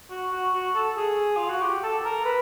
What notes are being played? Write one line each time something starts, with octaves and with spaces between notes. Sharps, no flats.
F#4
F#4
F#4
A4
G#4
F4
F#4
G4
A4
A#4
B4